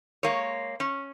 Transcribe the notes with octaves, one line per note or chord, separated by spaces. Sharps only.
G#3 A#3 C#5
C#4